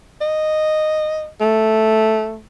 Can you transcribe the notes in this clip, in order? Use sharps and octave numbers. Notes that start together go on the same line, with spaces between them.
D#5
A3